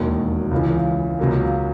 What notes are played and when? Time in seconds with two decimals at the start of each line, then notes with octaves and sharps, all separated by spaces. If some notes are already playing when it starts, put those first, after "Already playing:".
Already playing: E1 D#2 D#3 F#3
0.51 C#2 C#3 E3
1.19 C#2 C#3 F#3 A#3